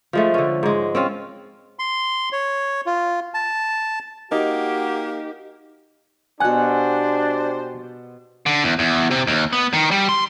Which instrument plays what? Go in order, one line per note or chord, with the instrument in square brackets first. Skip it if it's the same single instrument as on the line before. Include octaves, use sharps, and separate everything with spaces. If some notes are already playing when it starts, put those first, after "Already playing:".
[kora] F3 G#3 A3
D3 C#4
G#2 G#3
C4 C#4 F4
[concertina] C6
C#5
F4
A5
[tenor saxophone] A#3 [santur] D#4 [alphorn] F#4 [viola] G4
[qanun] B2 F#5 [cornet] D4 [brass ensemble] G4 C5 [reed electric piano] G#5 F#6
[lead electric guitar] D3
E2
E2
C3
D#2
B3
D#3
G3
C6